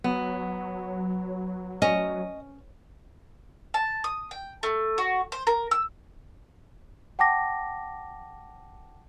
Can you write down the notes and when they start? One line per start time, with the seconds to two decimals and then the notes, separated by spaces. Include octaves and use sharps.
0.04 F#3 B3
1.82 C#4 D#5
3.74 A5
4.04 D#6
4.31 G5
4.63 A3
4.98 F#4
5.32 C5
5.47 A#4
5.71 E6
7.19 F#5 G5 A5 D6 A#6